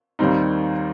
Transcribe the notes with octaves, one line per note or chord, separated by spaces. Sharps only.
D#2 D#3 G3 C4 D#4